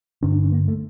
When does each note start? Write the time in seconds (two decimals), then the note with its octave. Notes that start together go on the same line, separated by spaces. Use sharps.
0.23 G2 D3 C#4
0.32 D4
0.43 C#4
0.52 A#3
0.68 A3